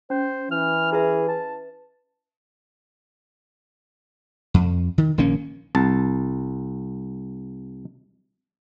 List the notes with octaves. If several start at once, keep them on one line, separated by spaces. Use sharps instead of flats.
C#4 C5
E3 F6
E4 G#4 B4 E5
A5
F2
D#3
A#1 D#3 A#3 C#4
C2 A5